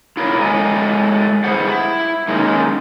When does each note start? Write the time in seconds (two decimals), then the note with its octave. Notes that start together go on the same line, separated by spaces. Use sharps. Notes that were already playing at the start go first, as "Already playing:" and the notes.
0.17 E4 F4 A#4 C#5
0.40 G#3 A3 A4 C#5 G#5
1.44 G2 E4 G#4 C5 F#5
1.68 E4
2.28 D#3 G#3 A#3 C#4 D#4